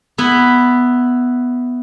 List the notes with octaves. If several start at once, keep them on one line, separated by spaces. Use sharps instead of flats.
B3 E4 B4